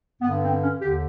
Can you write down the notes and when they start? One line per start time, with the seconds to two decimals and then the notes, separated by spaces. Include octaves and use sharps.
0.22 G2 D3 B3
0.42 C4
0.61 C#4
0.81 D#2 D3 G4